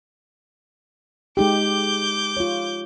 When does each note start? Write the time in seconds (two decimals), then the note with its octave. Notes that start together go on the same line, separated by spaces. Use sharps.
1.37 G#3 D#4 G4 D6 G6
2.37 F4 C#5